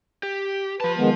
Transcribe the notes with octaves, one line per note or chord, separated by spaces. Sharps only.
G4
F3 B4 A5
D#3 G#3 B3